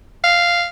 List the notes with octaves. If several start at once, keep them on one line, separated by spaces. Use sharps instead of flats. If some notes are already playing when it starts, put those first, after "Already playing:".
F5